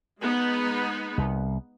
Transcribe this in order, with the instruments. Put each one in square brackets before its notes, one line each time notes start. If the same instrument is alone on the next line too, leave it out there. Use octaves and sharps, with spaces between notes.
[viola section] G#3 B3 D#4
[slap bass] C2